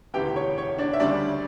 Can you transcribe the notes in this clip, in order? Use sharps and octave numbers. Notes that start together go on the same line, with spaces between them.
E1 D2 C#3 E3 G4 G5
C#5
C#5
D4 D5
E5
D2 C#3 G3 C#4 D4 D5